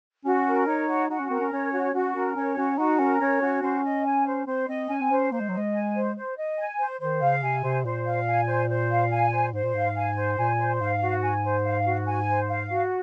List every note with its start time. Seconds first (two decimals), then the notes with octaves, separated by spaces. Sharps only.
0.25 C#4 F#4
0.46 A#4
0.67 D#4 C#5
0.89 F#4
1.10 D#4 F#4
1.20 C#4
1.30 C4 A#4
1.40 C#4
1.52 C#4 C#5
1.73 F#4
1.94 C#4 F#4
2.15 C#4 A#4
2.36 C#4 C#5
2.57 C#4 F#4
2.78 D#4 F#4
3.00 C#4 A#4
3.20 C#4 C#5
3.41 C#4 F#4
3.62 C#4 C5
3.84 D#5
4.05 G#5
4.27 C5
4.47 C4 C5
4.68 C4 D#5
4.89 C#4 G#5
5.01 C4
5.11 C#4 C5
5.32 A#3 C5
5.40 G#3
5.49 F#3
5.53 G#3 D#5
5.74 G#5
5.95 C5
6.16 C5
6.37 D#5
6.58 G#5
6.79 C5
7.00 D#3 C5
7.22 C#3 F5
7.43 C3 G#5
7.63 C3 C5
7.85 A#2 C5
8.06 F5
8.28 G#5
8.48 C5
8.70 C5
8.91 F5
9.11 G#5
9.32 C5
9.53 G#2 C5
9.64 A#2
9.75 G#2 F5
9.96 G#5
10.16 C5
10.38 A#2 G#5
10.59 C5
10.81 G#2 F5
11.01 F#4
11.22 G#5
11.44 C5
11.65 F5
11.86 F#4
12.07 G#5
12.29 C5
12.49 F5
12.70 F#4